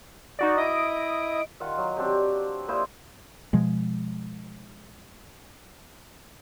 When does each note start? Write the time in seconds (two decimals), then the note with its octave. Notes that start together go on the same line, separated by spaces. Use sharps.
0.39 D#4 F#4 D5
0.57 E4 D#5 D#6 D7
1.60 D#3 F4 F5 F#5
1.77 F#3
1.96 C4 D4 G4
2.68 A#2 E4 C5 D#5
3.53 B2 F3 G#3